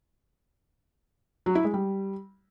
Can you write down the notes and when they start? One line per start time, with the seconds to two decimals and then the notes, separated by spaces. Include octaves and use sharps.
1.46 F#3
1.55 E4
1.64 G#3
1.74 G3